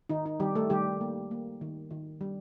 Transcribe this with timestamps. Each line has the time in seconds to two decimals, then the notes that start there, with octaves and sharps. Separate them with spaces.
0.09 D#3 D#4
0.26 D#4
0.40 D#3 G3 G4
0.55 A3 A4
0.70 D#3 G3 G4
1.01 A#3
1.31 A#3
1.61 D#3
1.91 D#3
2.21 G3